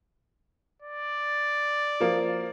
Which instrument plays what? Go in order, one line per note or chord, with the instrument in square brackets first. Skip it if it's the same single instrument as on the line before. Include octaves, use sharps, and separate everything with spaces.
[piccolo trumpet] D5
[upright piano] F3 A#3